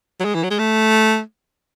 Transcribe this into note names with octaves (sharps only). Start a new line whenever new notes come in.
F#3
G#3
E3
F#3
G#3
A3